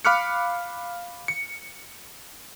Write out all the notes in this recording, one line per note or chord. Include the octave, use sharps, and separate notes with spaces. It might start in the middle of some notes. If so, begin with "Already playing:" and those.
F5 B5 D6 F6 F#6 C#7
C#7